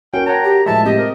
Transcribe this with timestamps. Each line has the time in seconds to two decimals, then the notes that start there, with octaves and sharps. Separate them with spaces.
0.14 C#4 F#4 A#4 G5
0.26 C#5 F#5 G5 A5 A#5
0.44 G4
0.66 A2 F3 G#3 E5 A5
0.85 C4 G4 D#5
0.98 A#4